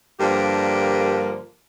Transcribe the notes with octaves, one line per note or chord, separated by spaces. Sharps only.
G2 D3 F3 A#3 G4 A#4